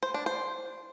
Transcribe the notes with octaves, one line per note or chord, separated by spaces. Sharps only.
C5
D4
C5